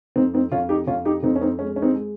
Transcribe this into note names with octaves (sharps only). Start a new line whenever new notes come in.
F2 C4 D#4
C4 D#4
F2 C#4 F4
D#4 G4
F2 C#4 F4
D#4 G4
F2 C4 D#4
C#4
C4 D#4
G#3 C#4
C#4
C4 D#4
G#3